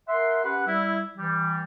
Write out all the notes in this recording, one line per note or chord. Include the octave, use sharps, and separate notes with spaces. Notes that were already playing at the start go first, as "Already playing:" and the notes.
A#4 E5 F#5 C6
C#4 G4 B4 F#5
G3 E4
E3 G3